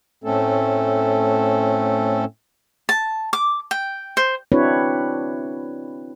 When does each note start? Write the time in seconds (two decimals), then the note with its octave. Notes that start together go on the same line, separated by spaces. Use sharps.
0.24 A2 A3 C4 C#4 A4
2.89 A5
3.33 D6
3.71 G5
4.17 C5
4.52 C4 D4 E4 F#4 B4 C#5